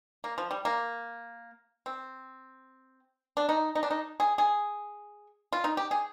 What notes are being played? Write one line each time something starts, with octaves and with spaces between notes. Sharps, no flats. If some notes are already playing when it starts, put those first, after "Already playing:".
A#3
F3
G3
A#3
C4
D4
D#4
D#4
D4
D#4
G#4
G#4
F4
D#4
G4
G#4